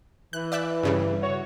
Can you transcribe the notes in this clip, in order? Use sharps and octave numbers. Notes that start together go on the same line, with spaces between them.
E3 F#6
D5 E5 F#6
G2 C#3 G3
F#4 C#5